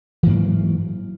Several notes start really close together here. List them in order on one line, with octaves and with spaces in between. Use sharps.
E3 G#2 A#3 F#3